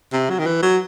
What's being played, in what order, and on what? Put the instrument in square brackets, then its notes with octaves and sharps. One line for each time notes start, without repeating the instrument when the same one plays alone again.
[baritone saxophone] C3
F#3
D#3
E3
F#3